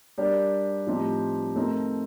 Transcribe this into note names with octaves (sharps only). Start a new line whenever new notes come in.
G3 D4 G4 A#4 D5
A2 F3 C4 D#4 G4
A3 C4 D#4 A#4